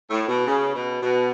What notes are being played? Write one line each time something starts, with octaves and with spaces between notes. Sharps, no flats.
A2
B2
C#3
B2
B2